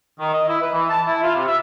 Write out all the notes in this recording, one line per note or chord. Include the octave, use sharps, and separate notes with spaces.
D#3
D#5
E4
B4
E3
A5
E4
F4
C3
E5